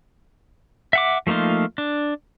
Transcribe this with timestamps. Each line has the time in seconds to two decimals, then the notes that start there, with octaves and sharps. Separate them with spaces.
0.93 E5 F#5 D6
1.27 F3 A3 A#3 D#4 F4
1.78 D4